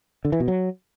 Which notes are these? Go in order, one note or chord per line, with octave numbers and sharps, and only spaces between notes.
D3
E3
B2
F#3